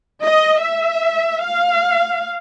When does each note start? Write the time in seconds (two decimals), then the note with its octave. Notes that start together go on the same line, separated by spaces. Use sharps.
0.22 D#5
0.61 E5
1.42 F5